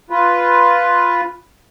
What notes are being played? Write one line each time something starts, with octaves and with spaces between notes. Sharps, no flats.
F4 B4